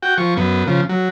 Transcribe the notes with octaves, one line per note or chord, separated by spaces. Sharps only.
F#4 G5
F3 C#6
F#2 B3
C#3 F3
F#3